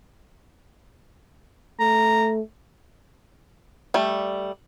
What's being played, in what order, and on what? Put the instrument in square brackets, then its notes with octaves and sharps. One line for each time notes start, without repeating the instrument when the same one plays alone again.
[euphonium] A3 [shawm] A#5
[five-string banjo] G3 A3